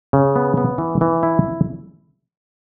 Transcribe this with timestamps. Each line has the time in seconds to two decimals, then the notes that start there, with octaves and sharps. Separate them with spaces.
0.13 C#3
0.36 B3
0.57 B3
0.78 E3
1.01 E3
1.23 E4